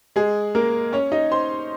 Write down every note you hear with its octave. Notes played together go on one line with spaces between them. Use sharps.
G#3 G#4
A#3 A#4
C#4 C#5
D#4 D#5
C5 C6